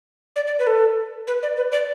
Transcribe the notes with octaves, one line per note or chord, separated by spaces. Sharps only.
D5
D5
B4
A4
B4
D5
B4
D5